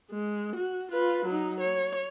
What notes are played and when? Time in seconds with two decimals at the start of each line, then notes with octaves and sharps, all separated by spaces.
0.10 G#3
0.56 F#4
0.91 F4 B4
1.25 F#3 D#4
1.60 C#5